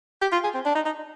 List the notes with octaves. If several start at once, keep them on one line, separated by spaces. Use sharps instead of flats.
G4
F4
G#4
C4
D4
D#4
D#4